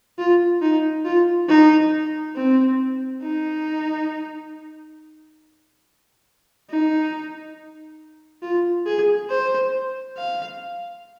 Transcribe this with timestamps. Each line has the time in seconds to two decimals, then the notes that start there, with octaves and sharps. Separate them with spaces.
0.19 F4
0.62 D#4
1.05 F4
1.48 D#4
2.36 C4
3.23 D#4
6.70 D#4
8.43 F4
8.86 G#4
9.30 C5
10.17 F5